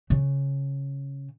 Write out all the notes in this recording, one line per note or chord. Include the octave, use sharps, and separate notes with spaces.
C#3